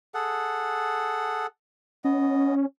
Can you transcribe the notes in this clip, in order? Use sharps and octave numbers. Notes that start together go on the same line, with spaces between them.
G#4 A4 F#5
B3 C#4 D#5